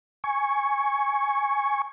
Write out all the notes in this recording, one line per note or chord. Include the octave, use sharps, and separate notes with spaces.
G#5 C#6